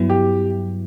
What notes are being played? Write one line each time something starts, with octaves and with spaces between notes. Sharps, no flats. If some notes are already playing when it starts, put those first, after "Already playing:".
Already playing: G2 F#3 B3 E4
G4